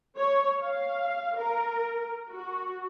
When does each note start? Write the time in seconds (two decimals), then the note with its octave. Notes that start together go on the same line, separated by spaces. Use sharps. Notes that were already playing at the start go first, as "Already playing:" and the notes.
0.16 C#5
0.60 F5
1.37 A#4
2.29 F#4